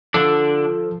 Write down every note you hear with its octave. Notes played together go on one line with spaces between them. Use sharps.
D3 F3 D4 A4